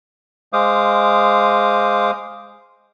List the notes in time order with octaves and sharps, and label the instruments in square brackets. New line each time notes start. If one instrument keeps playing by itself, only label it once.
[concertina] G#3 C5 F5 D6 D#6